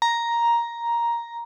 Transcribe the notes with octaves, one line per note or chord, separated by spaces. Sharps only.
A#5